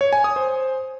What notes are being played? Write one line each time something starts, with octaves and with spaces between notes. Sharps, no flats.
C#5
G#5
D#6
C5